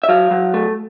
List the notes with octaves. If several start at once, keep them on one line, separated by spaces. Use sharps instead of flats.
E5
F#3 F5
F#3
A3